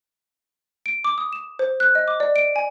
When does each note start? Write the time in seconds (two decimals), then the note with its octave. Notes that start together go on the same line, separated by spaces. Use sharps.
0.86 D7
1.04 D6
1.18 D#6
1.33 E7
1.59 C5
1.80 F#6
1.95 D#5
2.08 D6
2.20 D5
2.36 D7
2.56 G#5